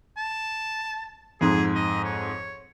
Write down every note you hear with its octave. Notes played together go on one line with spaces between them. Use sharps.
A5
F2 G#2 G#4
D#5
C#5